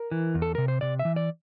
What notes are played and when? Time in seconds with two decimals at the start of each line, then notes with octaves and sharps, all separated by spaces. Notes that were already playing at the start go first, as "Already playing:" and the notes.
Already playing: A#4
0.11 E3
0.35 E2
0.42 A4
0.55 C3 A#4
0.68 C5
0.81 C3 D5
0.99 E5
1.05 E3
1.16 D5